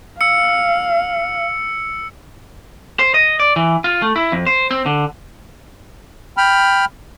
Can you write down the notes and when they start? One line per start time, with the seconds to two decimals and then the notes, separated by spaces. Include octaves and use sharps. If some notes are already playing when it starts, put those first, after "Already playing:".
0.21 F5 E6 C#7
2.99 C5
3.14 D#5
3.40 D5
3.56 E3
3.84 F4
4.02 A3
4.16 E4
4.32 F2
4.47 C5
4.71 C4
4.86 D3
6.37 G5 B5 F6